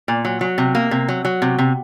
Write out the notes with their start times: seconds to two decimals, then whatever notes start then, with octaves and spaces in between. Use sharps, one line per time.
0.08 A#2
0.25 F#3
0.41 F#3
0.58 C3
0.75 A#3
0.91 C3
1.09 F#3
1.25 F#3
1.42 C3
1.59 C3